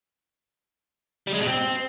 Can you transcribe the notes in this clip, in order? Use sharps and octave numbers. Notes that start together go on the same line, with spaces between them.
G3
G#3
B2
C4